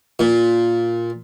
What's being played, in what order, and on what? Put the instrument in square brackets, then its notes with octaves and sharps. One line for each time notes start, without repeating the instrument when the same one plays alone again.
[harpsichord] A#2